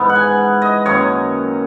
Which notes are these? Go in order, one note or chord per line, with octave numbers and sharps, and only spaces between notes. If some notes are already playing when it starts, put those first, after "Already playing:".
Already playing: G#2 E3 B3 D#4
F#5
G#5
D#5
F#2 D#3 F#3 A#3 C#5